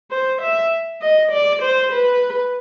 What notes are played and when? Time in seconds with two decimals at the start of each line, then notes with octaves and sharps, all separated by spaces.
0.11 C5
0.42 E5
1.02 D#5
1.32 D5
1.62 C5
1.92 B4